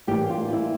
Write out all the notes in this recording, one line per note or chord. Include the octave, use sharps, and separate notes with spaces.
A2 E3 G3 A#3 G4
F4
F4
E4